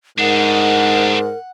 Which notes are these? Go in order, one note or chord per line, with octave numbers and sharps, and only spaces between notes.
G#2 D4 D#4 A#4 F#5